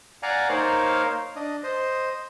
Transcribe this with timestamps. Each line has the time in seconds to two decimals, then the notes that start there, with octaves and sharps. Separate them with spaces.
0.23 D5 F5 F#5 G#5 A#5
0.49 A#3 D#4 A#4 C5 C#5 F5
1.36 D4 D#5
1.63 C5 D#5